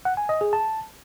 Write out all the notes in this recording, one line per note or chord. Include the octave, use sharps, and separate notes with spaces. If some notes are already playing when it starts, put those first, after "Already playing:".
F#5
G#5
D#5
G#4
A5